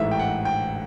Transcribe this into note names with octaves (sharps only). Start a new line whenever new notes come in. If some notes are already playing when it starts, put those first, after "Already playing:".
Already playing: A1 G#2 E3 A3 E5
G5
F#5
G5